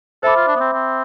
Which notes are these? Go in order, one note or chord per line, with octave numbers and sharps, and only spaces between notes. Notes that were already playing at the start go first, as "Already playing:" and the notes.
A4 C5 E5 B5 D6
F4
D4
B3
C4
C4